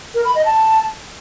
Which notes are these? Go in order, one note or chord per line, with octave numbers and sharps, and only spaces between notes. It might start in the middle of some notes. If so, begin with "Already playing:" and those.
A#4
B5
D#5
A5